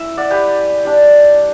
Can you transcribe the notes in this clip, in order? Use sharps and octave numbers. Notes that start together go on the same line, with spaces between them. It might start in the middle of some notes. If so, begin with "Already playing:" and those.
Already playing: C#4 E4 E5
D5 F#5
G4 B4
G3 D4